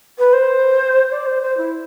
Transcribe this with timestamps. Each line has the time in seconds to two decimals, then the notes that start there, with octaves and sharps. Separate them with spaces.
0.18 B4
0.33 C5
1.11 D5
1.26 C5
1.42 C5
1.57 E4